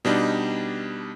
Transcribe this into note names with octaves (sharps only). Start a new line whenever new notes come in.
B2 G3 D4 D#4